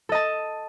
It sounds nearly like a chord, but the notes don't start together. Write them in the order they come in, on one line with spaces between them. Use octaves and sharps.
A4 D#5 A5